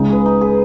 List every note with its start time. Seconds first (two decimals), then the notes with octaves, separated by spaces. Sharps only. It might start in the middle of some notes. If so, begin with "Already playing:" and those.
Already playing: C#2 C#3 D#4
0.09 G#4 B4
0.26 D#4
0.41 G#4 B4